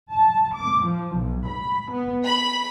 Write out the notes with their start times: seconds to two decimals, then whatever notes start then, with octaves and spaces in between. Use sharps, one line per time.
0.12 A5
0.54 D6
0.85 F3
1.17 B1
1.46 B5
1.91 B3
2.24 B5